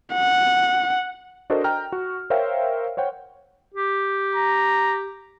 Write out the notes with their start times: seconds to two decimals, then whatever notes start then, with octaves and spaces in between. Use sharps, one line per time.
0.13 F#5
1.50 D4 F#4 A4 A#4 C5 D#5
1.64 G5 A#5 F6
1.92 F#4
2.30 A#4 C5 C#5 E5 F5 G5
2.97 C5 C#5 F#5 G5
3.74 G4
4.35 A#5